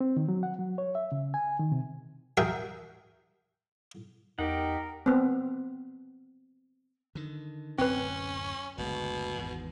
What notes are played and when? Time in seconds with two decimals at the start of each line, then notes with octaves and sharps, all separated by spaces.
0.01 C4
0.17 D#3
0.29 F#3
0.43 F#5
0.59 F#3
0.78 C#5
0.95 E5
1.12 C#3
1.34 G#5
1.59 D#3
1.72 C3
2.37 F#4 G#4 A#4 E5 G5
4.39 E2 D#4 G4 A#4 F#5
5.06 B3 C4
7.15 D3 D#3
7.78 D1 F#2 A2 C4 C#4 B4
8.78 F#1 D2 B2 G#3
9.36 G#1 E2 G#2